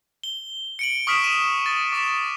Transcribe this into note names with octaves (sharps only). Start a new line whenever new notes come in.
G7
C#7 D7 F#7
C#6 D#6 F6 B6 D7 E7
D#7 E7
A6
D6 B6 E7